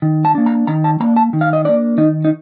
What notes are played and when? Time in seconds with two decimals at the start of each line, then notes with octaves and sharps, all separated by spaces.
0.02 D#3
0.25 A5
0.35 A#3 D4
0.46 A#5
0.67 D#3 A#5
0.84 A5
1.00 A#3 A#5
1.04 D4
1.16 A5
1.33 D#3
1.41 F5
1.53 D#5
1.65 A#3 D4 D5
1.98 D#3 D#4
2.25 D#4